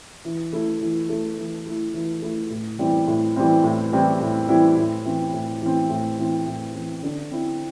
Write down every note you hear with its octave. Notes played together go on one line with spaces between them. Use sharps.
E3
A3 E4
E3
A3 E4
E3
A3 E4
E3
A3 E4
A2
E3 G3 C4 E4
A2
E3 G3 C4 E4
A2
E3 G3 C4 E4
A2
E3 G3 C4 E4
A2
E3 C4
A2
E3 C4
A2
E3 C4
A2
E3 C4
D3
C4 E4